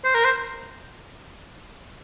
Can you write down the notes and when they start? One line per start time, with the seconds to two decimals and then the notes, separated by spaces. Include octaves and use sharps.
0.05 C5
0.15 A#4
0.25 C5